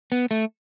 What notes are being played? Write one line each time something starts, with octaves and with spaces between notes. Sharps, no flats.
B3
A3